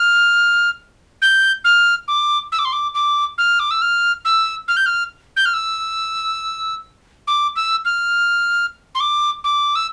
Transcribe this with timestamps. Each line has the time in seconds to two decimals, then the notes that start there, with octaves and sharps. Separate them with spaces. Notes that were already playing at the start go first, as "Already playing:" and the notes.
Already playing: F6
1.22 G6
1.64 F6
2.08 D6
2.52 E6
2.59 D6
2.65 C6
2.73 D6
2.95 D6
3.38 F6
3.60 D6
3.71 E6
3.82 F6
4.25 E6
4.68 F6
4.77 G6
4.86 F6
5.37 G6
5.46 F6
5.54 E6
7.27 D6
7.56 E6
7.85 F6
8.95 C6
9.00 D6
9.44 D6
9.75 E6